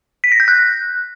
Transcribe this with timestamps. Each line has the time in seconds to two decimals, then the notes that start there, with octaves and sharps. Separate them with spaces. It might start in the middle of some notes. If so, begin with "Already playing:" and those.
0.24 B6
0.32 A#6
0.40 G6
0.48 F#6